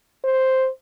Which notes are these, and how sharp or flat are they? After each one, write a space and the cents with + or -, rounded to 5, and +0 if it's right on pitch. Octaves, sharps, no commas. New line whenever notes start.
C5 +0